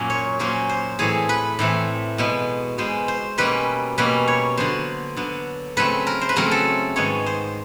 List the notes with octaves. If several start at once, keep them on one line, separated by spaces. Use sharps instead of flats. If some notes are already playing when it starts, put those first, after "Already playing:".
Already playing: F#2 A#2 F#3 A#3 C#4
C#5
A#2 F#3 A#3 C#4 C5
C5
A2 E3 A3 C4 G#4
B4
A2 E3 A3 C4
B2 G#3 B3
B2 G#3 B3 C5
C5
B2 G3 A#3 C#4 B4
B2 G3 A#3 C#4 B4
C#5
D3 F#3 B3 C5
D3 F#3 B3
C#3 F#3 A3 C4 B4
A#4
C5
B4
C#3 F#3 A3 C4 A#4
A4
G#2 D#3 G#3 B3 C#5
C5